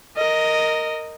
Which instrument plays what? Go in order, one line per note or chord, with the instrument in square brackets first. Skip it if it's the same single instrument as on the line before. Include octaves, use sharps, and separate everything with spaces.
[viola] A#4 D#5